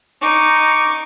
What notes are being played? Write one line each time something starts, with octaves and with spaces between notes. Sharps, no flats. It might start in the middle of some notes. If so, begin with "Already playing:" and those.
D#4 C#6 D6